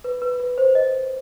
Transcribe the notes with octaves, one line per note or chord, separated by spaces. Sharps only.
B4
B4
B4
C5
D#5